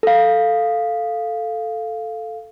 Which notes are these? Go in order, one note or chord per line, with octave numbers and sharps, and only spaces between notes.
A4 F5